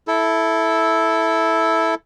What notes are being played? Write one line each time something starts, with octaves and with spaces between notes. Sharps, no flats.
E4 A4